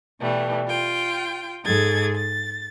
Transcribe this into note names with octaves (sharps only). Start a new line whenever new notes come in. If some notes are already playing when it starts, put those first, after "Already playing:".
B2 E3 G3 A3
F4 G5
G#2 G#4 A4 G#6 A6
A6